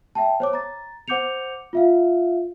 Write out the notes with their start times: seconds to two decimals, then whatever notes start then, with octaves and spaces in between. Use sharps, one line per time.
0.15 E5 G5 A5
0.40 C5 C#5 D6
0.53 A#5 A6
1.08 C5 F#5 D6 G6 C#7 F7
1.73 F4 E5 F5